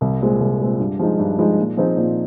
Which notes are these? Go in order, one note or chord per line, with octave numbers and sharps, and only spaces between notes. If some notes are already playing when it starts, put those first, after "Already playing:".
C2
A#2 G#3 C4
C2
A#2 G#3 C4
G2
F3 G#3 D#4
G2
F3 G#3 D#4
A#2
F3 C4 D#4 G#4
A#2